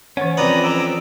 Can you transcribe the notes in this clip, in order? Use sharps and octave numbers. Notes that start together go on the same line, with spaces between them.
E3 C#4 C5 F#5
F2 B4 D5 A#5 D#6
A#5 B5 D6 E6